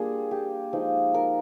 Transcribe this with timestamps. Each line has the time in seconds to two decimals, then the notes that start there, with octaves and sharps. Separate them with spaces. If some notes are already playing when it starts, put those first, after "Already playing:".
Already playing: G3 A#3 D4 F4 G#4
0.31 G4
0.73 F3 G#3 D#4
1.14 A#4